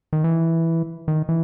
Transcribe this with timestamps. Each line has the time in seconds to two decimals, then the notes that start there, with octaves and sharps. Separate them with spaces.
0.13 D#3
0.24 E3
1.08 D#3
1.29 E3